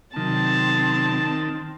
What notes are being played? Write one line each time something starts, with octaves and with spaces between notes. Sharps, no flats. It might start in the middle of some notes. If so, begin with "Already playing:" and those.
C3 D#3 F#3 C4 A5